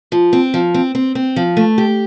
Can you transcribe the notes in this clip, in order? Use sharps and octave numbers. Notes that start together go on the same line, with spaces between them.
F3
C4
F3
C4
C4
C4
F3
A3
G4